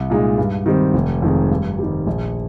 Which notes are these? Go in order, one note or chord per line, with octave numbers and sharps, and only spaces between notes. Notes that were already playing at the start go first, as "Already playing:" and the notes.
Already playing: C2
A#2 G#3 D#4
G2
D#3 G3 C4
F1
F2 D#3 G#3
G2
D#3 G3
A#1